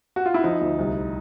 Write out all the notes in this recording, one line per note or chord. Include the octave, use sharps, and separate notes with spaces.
F#4
F4
E4
F3 D#4
D2
C2